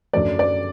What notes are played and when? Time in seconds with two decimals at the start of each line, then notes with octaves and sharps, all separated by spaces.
0.13 F#2 D3 F#3 A3 D5
0.39 D5